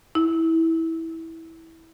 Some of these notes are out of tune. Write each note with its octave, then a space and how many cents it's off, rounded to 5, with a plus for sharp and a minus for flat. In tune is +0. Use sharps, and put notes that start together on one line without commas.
E4 -15